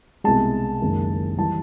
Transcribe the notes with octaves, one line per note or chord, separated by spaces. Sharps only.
C2 B2 G#3 A5
F#1 F#2 D#3 G#3
E3 G3 A5